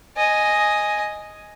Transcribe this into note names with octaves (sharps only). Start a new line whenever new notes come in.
D#5 G#5